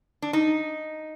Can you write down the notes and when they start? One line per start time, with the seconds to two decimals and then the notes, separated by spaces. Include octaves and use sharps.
0.22 D4
0.33 D#4